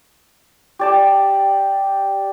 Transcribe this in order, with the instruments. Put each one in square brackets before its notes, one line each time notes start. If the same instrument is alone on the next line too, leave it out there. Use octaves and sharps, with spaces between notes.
[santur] G4 D5 A5